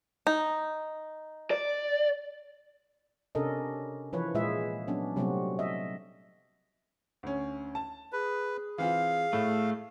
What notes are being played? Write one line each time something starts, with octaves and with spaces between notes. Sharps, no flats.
D#4
D5
C3 C#4 D4 A4 A#4 D#5
E3 F3 B4 C#5
A#2 G#3 F4 G#4 E5
F#3 B3 C#4 D4
C3 F#3 G3 A3 C4 F#4
D#5 E5
D2 C#4
A5
G#4 B4
E3 C4 F4 F5
A2 A3